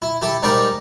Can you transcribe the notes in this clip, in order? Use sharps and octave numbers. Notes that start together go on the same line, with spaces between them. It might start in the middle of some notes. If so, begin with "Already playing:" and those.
E4
E4 G4 A4
G#2 G3 D#4 A#4 D5 G5